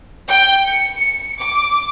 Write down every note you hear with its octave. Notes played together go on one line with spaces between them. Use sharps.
G5
C#7
D6